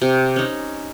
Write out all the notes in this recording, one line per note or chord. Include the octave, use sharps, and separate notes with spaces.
C3
C#4 D#4